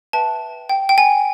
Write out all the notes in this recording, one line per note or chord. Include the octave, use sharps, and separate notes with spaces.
B4 E5 G5 A5
G5
G5
G#5